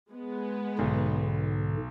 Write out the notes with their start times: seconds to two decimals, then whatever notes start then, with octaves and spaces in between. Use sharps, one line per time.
0.10 G#3 B3
0.79 B1 G#2 D3